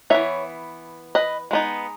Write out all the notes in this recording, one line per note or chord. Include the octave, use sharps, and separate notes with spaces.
E3 B3 D#4 C#5 E5
B4 D#5
G#3 B3 D#4